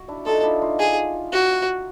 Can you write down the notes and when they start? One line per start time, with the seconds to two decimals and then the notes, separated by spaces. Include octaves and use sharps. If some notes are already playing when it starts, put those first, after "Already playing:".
Already playing: F#4
0.08 D4 E4
0.26 D#4 F4 A4
0.43 D4 E4
0.62 D#4 F4
0.79 G#4
1.33 F#4